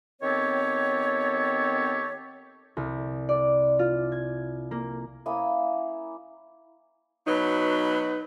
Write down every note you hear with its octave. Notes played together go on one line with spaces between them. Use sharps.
D#3 B3 C4 G4 A4 C#5
C2
D5
F4
G#6
A#3
A#3 C#4 E4 D#6
B2 F#3 D#4 B4